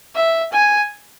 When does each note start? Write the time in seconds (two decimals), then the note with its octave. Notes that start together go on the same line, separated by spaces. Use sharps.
0.15 E5
0.53 G#5